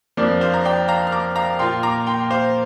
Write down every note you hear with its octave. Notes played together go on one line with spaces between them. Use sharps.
F2 F3 D4 A#4 D5
C5 F5
A#5
D5 G5
F5 A#5
F6
A#5 D6
F5 A#5
A#2 A#3 F4 G5 C6
A#5 D6
G5 C6
C5 F5